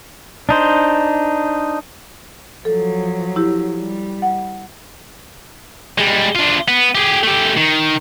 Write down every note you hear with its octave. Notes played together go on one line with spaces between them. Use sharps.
D4 D#4 C5
F3 F#3 A4
E4 G4
G3
F#5
G3 G#3
D4 F4
B3
G4 G#4
A3 G4
D#3